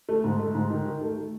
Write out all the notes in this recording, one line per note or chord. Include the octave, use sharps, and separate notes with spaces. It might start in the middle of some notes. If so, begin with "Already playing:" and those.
A3
G#2
A3
G#2
D#3
D#3
A3
A3